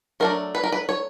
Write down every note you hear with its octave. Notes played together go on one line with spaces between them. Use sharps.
F#3 A3 D4 A#4
B4
A#4
B4
C#5